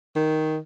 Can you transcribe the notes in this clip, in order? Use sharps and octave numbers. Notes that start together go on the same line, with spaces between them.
D#3